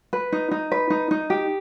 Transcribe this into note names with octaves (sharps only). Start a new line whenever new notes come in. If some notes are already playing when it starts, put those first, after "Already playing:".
B4
D#4
D#4
B4
D#4
D#4
G4